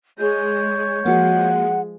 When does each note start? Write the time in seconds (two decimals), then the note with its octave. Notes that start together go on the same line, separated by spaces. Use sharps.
0.18 G#3 C#5 G6
1.06 F3 G#3 A#3 F#4 F#5